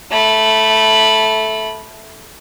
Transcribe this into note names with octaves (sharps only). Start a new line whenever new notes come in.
A3 B5